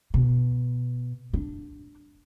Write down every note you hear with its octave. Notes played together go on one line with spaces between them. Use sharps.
B2
D4